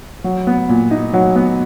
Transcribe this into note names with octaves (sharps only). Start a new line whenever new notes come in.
F#3
B3
A#2
D#4
F#3
B3